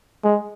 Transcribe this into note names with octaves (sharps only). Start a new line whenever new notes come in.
G#3